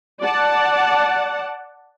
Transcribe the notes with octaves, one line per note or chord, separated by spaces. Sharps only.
D5 F#5 A5